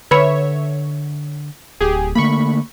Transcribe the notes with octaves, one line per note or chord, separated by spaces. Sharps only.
D3 B4 C#5 E5 B5 C#7
D1 G4 G#4
D3 A3 A#3 B5 C#6